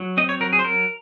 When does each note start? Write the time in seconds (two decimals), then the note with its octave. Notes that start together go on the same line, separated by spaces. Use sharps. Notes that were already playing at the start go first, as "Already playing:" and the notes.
Already playing: F#3
0.17 C4 D#5
0.29 C#5
0.40 F#3 A#4
0.53 G#4
0.59 C5
0.64 F#3 A#4